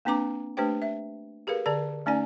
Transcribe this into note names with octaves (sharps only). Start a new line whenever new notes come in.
A#3 C4 D4 B4 A#5 D6
A3 D4 G4 B4 C5 G5
E5
G4 G#4 A#4 B4 F5
D3 G#4 D5 A5
A3 C#4 D#4 D5 G#5